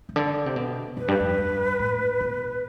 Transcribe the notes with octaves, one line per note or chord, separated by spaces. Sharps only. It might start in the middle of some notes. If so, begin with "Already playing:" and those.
C3
D3
C3
B2
F2 B4
G2
F2
G2
A2
B2